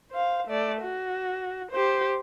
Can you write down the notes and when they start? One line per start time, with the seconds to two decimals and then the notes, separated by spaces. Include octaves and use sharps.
0.12 C5 F5
0.47 A3 D5
0.81 F#4
1.71 G4 C5